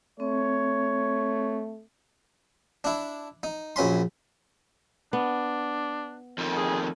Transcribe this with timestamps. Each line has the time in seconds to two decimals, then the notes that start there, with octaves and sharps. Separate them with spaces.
0.20 A3 C4 C#5
2.84 D4 E4
3.43 D#4
3.76 A#1 F#2 C#4 B5 C6
5.13 B3 D4
6.38 F2 D#3
6.57 G#4